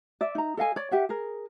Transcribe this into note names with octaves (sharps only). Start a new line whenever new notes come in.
D5 E5
D#4 A#5
A4 D#5 F5 G#5
C#5 D5
G4 E5 F#5
G#4 A#4